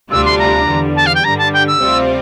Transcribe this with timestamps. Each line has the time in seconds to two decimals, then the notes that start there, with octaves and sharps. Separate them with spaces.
0.10 D2 C3 G3 D4 F4 E6
0.25 C6
0.39 A#5
0.67 E2 D3 G3
0.95 A5
1.06 F5
1.14 G5
1.24 G2 D3 G3 A#5
1.38 A5
1.53 G5
1.67 E6
1.81 D2 C3 G3 C4 F4